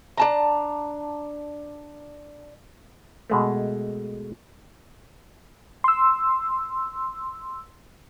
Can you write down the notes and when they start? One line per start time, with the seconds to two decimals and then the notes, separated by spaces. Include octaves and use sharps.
0.17 D4 A5 A#5
3.30 B2 G#3 A3
5.84 C6 E6